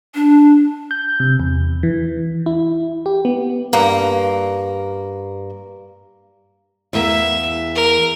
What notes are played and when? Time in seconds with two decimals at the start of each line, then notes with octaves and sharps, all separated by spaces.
0.15 D4
0.91 G6
1.20 C3
1.40 E2
1.83 E3
2.46 E4
3.06 G4
3.25 B3
3.73 G2 A#3
6.93 E2 A#3 E5
7.75 A#4